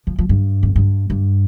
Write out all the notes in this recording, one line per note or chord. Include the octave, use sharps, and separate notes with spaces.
F3
F3
G2
F2
G2
G2